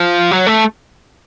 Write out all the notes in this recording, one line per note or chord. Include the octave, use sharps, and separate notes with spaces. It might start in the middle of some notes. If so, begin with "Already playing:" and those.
Already playing: F3
F#3
A3